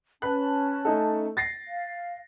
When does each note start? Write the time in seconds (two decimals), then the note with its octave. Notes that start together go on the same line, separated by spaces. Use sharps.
0.22 C#4 B4 A5 F#6
0.85 A3 D#4 A4
1.37 A6 A#6 C7
1.67 F5